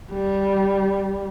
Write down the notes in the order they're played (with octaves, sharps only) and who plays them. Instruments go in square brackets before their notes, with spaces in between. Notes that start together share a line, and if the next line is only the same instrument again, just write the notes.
[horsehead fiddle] G3